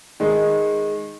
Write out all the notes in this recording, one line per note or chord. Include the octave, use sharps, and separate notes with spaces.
D#3 G#3